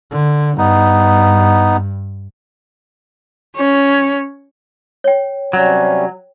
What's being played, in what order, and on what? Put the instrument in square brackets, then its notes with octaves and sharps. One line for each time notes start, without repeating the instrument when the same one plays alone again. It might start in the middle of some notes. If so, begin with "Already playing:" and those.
[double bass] D3
[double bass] G2 [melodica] B3 D#4
[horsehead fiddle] C#4 C#5
[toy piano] C#5 G5
[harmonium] C3 G3 C#4 [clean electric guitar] F#3